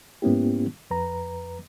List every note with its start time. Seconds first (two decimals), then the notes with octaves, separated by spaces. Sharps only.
0.22 G#2 A#3 B3 C#4 E4 G4
0.90 F2 B4 A#5